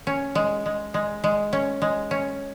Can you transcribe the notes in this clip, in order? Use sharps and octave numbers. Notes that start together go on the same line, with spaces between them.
C#4
G#3
G#3
G#3
G#3
C#4
G#3
C#4